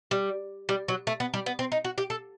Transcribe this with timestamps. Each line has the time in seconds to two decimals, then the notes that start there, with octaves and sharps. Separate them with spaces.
0.11 G3
0.69 G3
0.88 F#3
1.07 A3
1.20 B3
1.34 G3
1.46 B3
1.59 C4
1.72 D#4
1.84 F#4
1.98 G4
2.10 A4